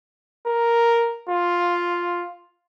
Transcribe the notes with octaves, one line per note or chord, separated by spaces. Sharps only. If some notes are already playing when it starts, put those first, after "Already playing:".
A#4
F4